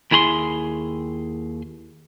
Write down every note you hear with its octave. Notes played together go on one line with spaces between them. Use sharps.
D#2 E4 G#4 B5 C6